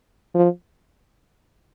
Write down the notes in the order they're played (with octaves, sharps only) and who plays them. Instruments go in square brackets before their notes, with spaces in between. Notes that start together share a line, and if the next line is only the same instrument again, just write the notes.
[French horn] F3